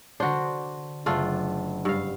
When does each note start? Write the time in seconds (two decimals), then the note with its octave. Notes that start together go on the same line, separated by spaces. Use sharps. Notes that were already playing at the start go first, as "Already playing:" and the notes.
0.20 D3 D4 F#4 C5
1.06 F#1 A3 D4 F4
1.85 G2 F5